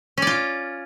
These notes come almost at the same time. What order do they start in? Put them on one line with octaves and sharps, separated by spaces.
C#4 D5 F4